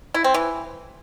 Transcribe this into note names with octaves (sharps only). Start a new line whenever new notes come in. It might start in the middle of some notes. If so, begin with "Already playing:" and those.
E4
C4
E3